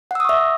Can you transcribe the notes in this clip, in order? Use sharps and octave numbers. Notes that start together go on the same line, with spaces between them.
E5 F#5 C#6 D#6 E6